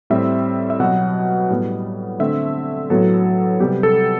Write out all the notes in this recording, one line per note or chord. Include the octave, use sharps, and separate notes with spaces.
A2 G3 C4 E5
E5
B2 F#3 B3 F#5
A2 G3 B3
D3 A3 C4 E5
A2 F#3 B3 A4
C3 G3 B3 G4
A4